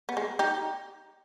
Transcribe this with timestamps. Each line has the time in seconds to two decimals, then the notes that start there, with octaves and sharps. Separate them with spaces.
0.09 B3
0.17 G#3
0.39 D#4 G4